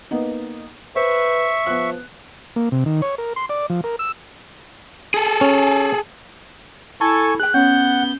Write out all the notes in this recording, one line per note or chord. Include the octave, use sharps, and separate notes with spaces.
A#3 B3 D#4
B4 C5 E5 C#6
F3 B3 F#6
A#3
C3
D#3
C#5
A#4
C6
D5
F3
A#4
E6
G#4 A4
C#4
E4 A4 G#5 C#6
G#4 G5 F#6
B3 C#4 F#5 G6